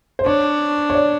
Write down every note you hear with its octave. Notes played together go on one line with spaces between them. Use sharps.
C5
D4 C#5
C#5
D5